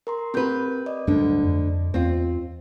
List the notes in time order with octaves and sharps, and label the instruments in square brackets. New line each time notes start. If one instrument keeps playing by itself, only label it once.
[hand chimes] A#4 A#5 C6
[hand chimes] C4 A#4 G6 [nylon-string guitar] G4 B4
[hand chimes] D5 D#5
[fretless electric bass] D1 G2 D4 [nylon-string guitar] D2 D3
[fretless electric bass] F2
[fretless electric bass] E2 [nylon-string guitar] C4 F4